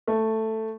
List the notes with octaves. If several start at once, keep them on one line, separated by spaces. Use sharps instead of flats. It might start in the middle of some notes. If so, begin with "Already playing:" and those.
A3